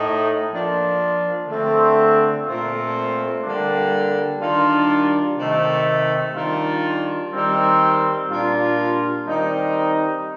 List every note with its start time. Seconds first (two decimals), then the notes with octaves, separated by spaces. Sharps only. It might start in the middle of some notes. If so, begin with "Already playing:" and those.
Already playing: A2 A3 D#4
0.50 F3 A#3 D4 F4
1.48 D3 A3 C4
2.45 A#2 A3 C4 F4
3.43 D3 G3 A#3 D4
4.40 D#3 G3 D4 F4
5.38 C3 D#3 A3
6.34 D#3 G3 D4 F4
7.32 D#3 G3 C4
8.29 A#2 G3 D4 F4
9.27 D#3 G3 C4 D#4